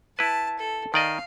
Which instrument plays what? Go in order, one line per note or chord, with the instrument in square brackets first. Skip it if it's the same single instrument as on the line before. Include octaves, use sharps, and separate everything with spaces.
[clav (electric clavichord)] E4 B4 [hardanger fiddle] A5
[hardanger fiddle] A4
[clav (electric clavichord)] D#3 D5 D#5 [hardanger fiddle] F5